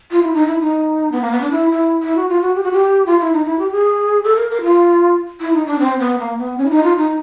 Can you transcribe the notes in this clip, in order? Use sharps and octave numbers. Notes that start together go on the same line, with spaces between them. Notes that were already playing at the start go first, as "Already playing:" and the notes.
F4
E4
D#4
E4
D#4
B3
A#3
B3
D4
E4
E4
E4
F#4
F4
F#4
G4
F#4
G4
F4
E4
D#4
E4
G4
G#4
A4
A#4
A#4
F4
E4
D#4
D4
C4
B3
A#3
B3
C#4
E4
D#4
F4
D#4